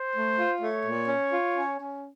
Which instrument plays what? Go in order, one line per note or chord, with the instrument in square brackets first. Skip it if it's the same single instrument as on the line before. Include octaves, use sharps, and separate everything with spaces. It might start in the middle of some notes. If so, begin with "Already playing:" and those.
Already playing: [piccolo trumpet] C5
[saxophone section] A3
F4
[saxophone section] A3 [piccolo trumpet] C#5
[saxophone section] A#2
C#4
F4
C#4
C#4